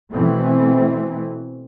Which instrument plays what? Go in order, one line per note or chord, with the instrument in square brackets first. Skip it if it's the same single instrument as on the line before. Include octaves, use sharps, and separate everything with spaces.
[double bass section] B2 E3 A3 C4